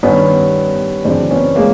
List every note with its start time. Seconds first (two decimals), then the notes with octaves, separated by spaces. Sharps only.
0.03 G2 D#3 B3 C#4
1.05 F#2 C#3 E3 C4 D4
1.31 B3 C#4
1.56 G#3 A#3